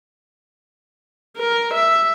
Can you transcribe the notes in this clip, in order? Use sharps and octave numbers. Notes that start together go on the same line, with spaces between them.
A#4
E5